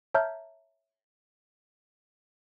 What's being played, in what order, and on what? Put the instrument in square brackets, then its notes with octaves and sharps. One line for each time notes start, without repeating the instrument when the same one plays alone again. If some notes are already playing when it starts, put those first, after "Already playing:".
[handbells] C#5 E5 A5 A#5 F6 G6